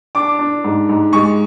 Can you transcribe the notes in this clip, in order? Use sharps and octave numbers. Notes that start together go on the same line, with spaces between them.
D4 D6
D4
G#2
G#2
G#3 C#6